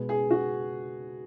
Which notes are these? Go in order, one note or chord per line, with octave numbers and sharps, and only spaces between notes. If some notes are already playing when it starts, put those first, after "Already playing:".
Already playing: B2 G#3 B3
G#4
F#4